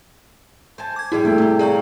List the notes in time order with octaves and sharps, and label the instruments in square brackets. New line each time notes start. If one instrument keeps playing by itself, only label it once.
[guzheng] C5 G#5 A5
[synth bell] D6 G#6
[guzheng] A2 G3 [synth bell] E4 G#4
[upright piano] A3 [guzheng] G5
[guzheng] C3 G4
[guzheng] F4 A#4 C#5 [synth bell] G#4 D5 G6